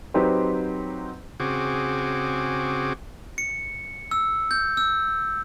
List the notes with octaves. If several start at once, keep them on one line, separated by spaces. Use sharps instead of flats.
F#3 C4 D#4 G4 B4 C5
C#3 C4 F#4 G#4 D6
C#7
E6
G6
E6